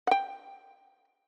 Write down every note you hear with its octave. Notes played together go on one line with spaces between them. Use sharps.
F#5 G5